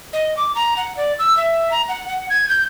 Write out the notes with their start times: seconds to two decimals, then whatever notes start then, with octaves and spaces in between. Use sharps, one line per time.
0.13 D#5
0.37 D6
0.55 A#5
0.77 F#5
0.97 D5
1.19 E6
1.37 E5
1.71 A#5
1.88 F#5
2.08 F#5
2.30 G#6
2.49 G6